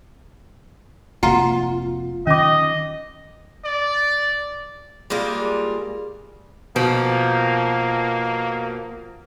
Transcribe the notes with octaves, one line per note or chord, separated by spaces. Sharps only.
F1 G#2 A#3 F4 F#4 F#5 A#5
D#3 C#4 D#5 D6
D5
G3 G#3 A#3 F4
B2 F3 A#3